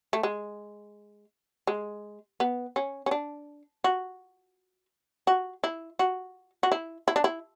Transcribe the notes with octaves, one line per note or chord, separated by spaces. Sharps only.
A3
G#3
G#3
B3
C#4
C#4
D4
F#4
F#4
E4
F#4
F#4
E4
E4
D4
E4